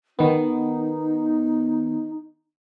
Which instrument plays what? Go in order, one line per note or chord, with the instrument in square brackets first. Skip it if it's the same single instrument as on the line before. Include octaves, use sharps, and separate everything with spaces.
[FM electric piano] D#3 B3 [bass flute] D#4